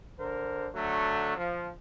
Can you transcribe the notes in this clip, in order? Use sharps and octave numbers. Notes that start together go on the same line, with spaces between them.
D3 A#4 C5
D3 F#3 A3
F3